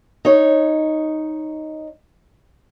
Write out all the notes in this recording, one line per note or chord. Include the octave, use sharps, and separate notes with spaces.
D#4 C#5